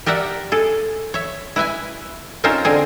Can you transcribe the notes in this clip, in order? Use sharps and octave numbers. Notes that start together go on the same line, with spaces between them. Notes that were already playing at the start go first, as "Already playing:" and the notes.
G4 A#4 D5 E5 F#5
G#4 A4
C#5 E5
E4 B4 E5 G#5
C4 C#4 D#4 F4 A#4 C5
D3 C4 G#4